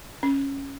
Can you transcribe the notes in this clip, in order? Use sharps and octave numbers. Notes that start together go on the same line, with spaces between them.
C#4